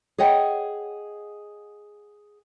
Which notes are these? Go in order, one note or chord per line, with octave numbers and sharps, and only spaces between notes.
G#4 C#5 D#5 F#5 G5